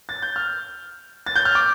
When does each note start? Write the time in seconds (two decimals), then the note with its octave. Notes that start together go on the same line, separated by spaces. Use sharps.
0.09 A6
0.22 G6
0.36 F6
1.26 A6
1.36 G6
1.45 F6
1.55 D6